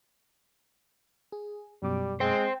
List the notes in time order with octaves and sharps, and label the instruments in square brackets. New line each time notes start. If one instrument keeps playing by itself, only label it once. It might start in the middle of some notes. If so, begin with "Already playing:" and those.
[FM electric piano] G#4
[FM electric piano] F#2 B2 D6 [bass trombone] G3
[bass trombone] G#3 [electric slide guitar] C5 G5